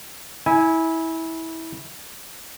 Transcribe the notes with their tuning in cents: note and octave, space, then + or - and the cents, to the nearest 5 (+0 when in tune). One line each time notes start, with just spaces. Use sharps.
E4 -20 G#5 +0